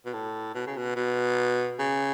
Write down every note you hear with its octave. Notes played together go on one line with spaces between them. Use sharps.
B2
A2
B2
C#3
B2
B2
C#3